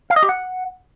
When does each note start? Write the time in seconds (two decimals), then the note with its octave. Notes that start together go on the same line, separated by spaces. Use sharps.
0.10 F5
0.16 D#5
0.23 G4
0.29 F#5